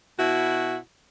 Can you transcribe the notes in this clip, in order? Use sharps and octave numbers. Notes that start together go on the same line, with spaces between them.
B2 E4 F#4